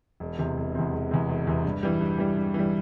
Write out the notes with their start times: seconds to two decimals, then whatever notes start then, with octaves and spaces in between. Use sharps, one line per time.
0.20 E1
0.39 E2 C3
0.57 E1
0.75 E2 C3
0.92 E1
1.11 E2 C3
1.29 E1
1.47 E2 C3
1.64 G2
1.83 E3 G3
2.01 G2
2.18 E3 G3
2.37 G2
2.54 E3 G3